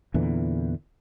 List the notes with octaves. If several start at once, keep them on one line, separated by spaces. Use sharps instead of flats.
E2 A#2 D3 E3